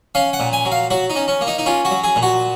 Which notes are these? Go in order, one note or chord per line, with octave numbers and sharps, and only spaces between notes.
C#4 F5
F#5
A#2
G#5
F#3
F5
F#3 F#4
D#4
C#4
C#4
A#3
D#4
D#4
C#4 F4
F#4
F#3
G#4
A#2
F#4